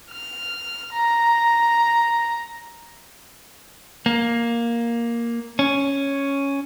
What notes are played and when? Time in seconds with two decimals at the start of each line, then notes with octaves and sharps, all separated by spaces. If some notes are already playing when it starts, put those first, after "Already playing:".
0.12 F6
0.94 A#5
4.06 A#3
5.59 C#4